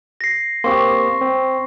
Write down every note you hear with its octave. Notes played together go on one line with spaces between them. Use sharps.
A#6 C7
A#3 C4 G4 C6 C#6
C4